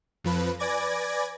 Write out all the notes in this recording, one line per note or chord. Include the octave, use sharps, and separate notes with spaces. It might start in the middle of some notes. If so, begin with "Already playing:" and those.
F2 F3 B4
B4 D5 G#5 D6 G#6 A#6